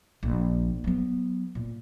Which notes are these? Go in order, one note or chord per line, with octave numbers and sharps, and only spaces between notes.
A#1
F#3 B3
A#2